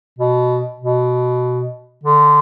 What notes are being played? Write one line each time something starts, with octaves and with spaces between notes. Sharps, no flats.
B2
B2
D3